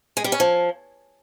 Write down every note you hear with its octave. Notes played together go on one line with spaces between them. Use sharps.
G#3
G3
C#4
F3